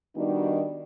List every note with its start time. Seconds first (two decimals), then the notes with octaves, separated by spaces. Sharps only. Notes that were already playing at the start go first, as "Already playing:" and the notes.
0.16 D#3 G3 B3 D4 D#4 F#4